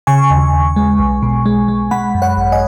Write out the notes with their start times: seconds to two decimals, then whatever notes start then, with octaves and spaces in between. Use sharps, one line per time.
0.07 C#3 G#5 C#6
0.30 D#2
0.53 D#2
0.76 G#3
0.99 B1
1.23 B2
1.46 G#3
1.68 G#3
1.91 G#3 F#5 B5
2.15 F#2
2.22 C#5 F#5
2.37 G#1
2.52 D#5 G#5